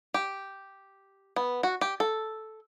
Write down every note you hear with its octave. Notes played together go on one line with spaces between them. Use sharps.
G4
B3
F#4
G4
A4